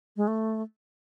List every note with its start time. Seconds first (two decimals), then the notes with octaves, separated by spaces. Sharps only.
0.17 G#3
0.27 A3